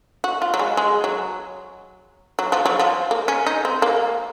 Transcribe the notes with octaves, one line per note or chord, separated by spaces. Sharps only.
F#4
F4
F#3
G#3
G#3
F#3
F#3
F3
F#3
F3
A#3
C#4
D#4
C4
A#3